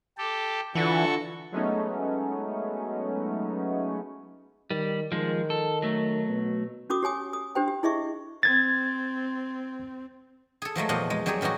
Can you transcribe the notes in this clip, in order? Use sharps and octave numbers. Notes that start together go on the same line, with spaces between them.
G4 A4
D3 E3 F4 F#4 A4 C#6
F#3 G#3 A3 B3 C#4 D#4
D#3 G3
D#3 F3 G#3
A4
F#3 A3
B2
C#4 F#4 D6 D#6
G4 C#5 G#5 D#6
D#6
D4 G4 C5 G5
G4
E4 G#4 D#5 E5 C#6
C4 G#6 A6
G#4 A4
F3 F#3 G#3 A3
E2 A#2 F3 F#4 G4 D#5
G#3
F#3 G3 G4 G#4 C#5
A2 E3 G3 D#4 F#4